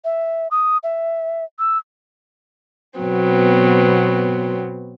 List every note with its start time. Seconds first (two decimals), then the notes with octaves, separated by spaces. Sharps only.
0.05 E5
0.51 D#6
0.83 E5
1.59 E6
2.99 B2 F#3 B3 C4